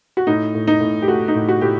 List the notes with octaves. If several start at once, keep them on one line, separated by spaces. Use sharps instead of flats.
F#4
A2 D#4
A2
D#4
A2
G4
A3 F#4
D#4
A2
F#4
A2 G4